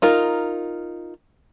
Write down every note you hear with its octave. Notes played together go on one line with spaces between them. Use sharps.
D#4 F4 A#4